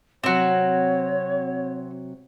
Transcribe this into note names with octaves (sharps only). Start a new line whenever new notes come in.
C3 F#3 C4 F#4 C#5